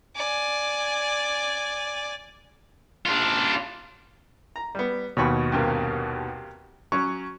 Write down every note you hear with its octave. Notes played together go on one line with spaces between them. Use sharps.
D5 G#5
D4 F4
A#5
G3 B3
D#2 B2 C#5 B5 C#6
G2 C3 A#3
F#3 C#4 C#6